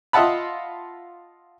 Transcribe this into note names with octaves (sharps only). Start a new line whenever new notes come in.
F4 D#5 E5 F#5 A5 B5